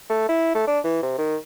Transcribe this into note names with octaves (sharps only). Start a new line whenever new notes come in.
A3
E4
A3
D4
E3
C3
D#3